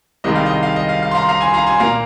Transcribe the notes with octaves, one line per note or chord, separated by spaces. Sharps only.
C2 C3 D#3 G#3 D#5
F5
D#5
F5
D#5
F5
F5
C6
F5 A#5
F5 A#5
G#5 C6
F5 A#5
G#5 C6
A#2 A#3 F5 A#5